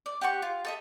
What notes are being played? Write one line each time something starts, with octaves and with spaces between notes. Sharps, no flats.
D5
G4 F#5 A5 C#6
F4
A4 D#5 E5